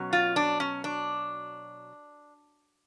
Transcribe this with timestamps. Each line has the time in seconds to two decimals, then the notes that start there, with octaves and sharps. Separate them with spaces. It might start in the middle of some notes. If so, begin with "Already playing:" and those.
Already playing: B2 F#3 C#4
0.13 F4
0.36 D4
0.60 C#4
0.84 D4